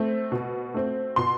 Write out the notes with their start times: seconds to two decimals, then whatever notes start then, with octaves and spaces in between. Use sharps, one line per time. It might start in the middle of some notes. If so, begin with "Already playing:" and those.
Already playing: A3 C4
0.32 B2
0.74 A3 C4
1.16 B2 C6